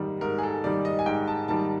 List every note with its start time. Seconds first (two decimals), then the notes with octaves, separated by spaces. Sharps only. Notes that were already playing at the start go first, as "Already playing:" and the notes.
Already playing: G#2 D#3 G3
0.21 G#2 A#4
0.38 G#4
0.43 A4
0.64 D#3 G3 D5
0.85 D#5
0.99 G#5
1.06 G#2 G5
1.27 A5
1.48 D#3 G3 A5